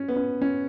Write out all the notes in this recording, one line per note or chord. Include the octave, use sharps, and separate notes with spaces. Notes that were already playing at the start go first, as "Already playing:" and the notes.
Already playing: C#4
B3
C#4
C#4